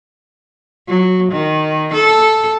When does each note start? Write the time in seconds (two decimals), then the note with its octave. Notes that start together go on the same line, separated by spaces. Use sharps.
0.88 F#3
1.32 D#3
1.94 A4